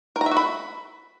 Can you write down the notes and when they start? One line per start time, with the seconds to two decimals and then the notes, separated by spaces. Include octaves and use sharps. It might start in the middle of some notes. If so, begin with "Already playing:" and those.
0.16 A#4
0.21 A#5
0.26 E5
0.31 F#4
0.37 B5